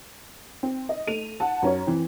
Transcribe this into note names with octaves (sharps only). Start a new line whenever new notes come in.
C4
D#5
A3 D#7 F7
F#5 A5
F#2 C#4 C#5
E3 C4